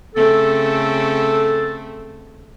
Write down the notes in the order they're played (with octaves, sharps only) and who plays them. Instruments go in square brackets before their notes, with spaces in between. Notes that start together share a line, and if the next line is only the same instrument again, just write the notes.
[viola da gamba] C#3 A3 C4 [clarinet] A4